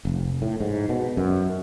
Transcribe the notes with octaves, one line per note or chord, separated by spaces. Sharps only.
F1
A2
G#2
B2
F#2